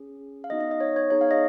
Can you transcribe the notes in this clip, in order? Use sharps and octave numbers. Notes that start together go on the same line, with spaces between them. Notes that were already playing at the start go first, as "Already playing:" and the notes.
Already playing: C#4 G#4
F5
B3 D#4 F#4 D#5
D#5
D#5
C#5
C#5
B3 D#4 G#4 C#5
F5
D#5